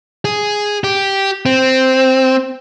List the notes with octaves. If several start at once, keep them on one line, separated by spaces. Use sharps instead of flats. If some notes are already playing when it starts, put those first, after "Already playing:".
G#4
G4
C4